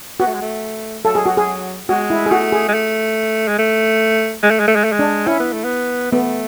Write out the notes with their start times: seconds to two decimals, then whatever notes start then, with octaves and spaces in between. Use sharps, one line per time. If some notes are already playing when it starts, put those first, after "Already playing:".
0.20 B3 F#4
0.27 A3
0.34 G#3
0.42 A3
1.04 F#3 A4
1.15 G#4
1.26 F#4
1.37 G#4
1.89 G#3 F#4
2.10 E4
2.26 G#4
2.31 A3 F#4
2.52 G#4
2.68 G#3
2.74 A3
3.48 G#3
3.59 A3
4.43 G#3
4.51 A3
4.60 G#3
4.67 A3
4.76 G#3
4.84 A3
4.92 G#3
4.99 D4
5.27 C#4 E4
5.40 B3
5.53 A3
5.64 B3
6.12 A3 B3